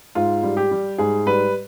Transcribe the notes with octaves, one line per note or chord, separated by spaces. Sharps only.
G#2 F4
G3
G4
G3
G#2 G#4
G3 B4